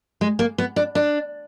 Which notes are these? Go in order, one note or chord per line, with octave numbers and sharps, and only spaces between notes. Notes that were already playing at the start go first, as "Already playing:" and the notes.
G#3
A#3
B3
D4
D4